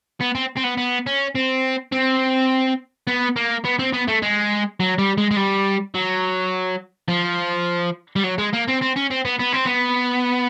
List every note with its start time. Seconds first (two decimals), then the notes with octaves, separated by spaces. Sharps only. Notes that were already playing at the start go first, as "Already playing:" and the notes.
0.21 B3
0.35 C4
0.57 C4
0.64 B3
0.77 B3
1.06 C#4
1.35 C4
1.92 C4
3.07 B3
3.36 A#3
3.65 B3
3.79 C4
3.93 B3
4.08 A3
4.22 G#3
4.80 F#3
4.99 G3
5.18 G#3
5.31 G#3
5.37 G3
5.95 F#3
7.09 F3
8.16 G3
8.24 F#3
8.38 G#3
8.53 A#3
8.68 C4
8.81 C4
8.96 C#4
9.10 C4
9.25 B3
9.39 B3
9.52 C4
9.66 B3